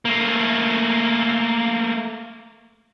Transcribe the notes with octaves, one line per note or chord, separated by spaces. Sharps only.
A3 A#3